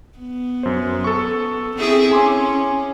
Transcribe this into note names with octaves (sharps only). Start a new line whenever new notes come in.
B3
F#2 C5
A4 C#6
C4 E4 G#4
C#4 G#5 C6 D6